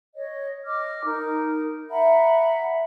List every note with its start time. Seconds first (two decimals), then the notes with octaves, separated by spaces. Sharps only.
0.15 C#5 D#5
0.65 D#5 D6 F6
1.04 D#4 A#4
1.90 E5 F#5 A#5 B5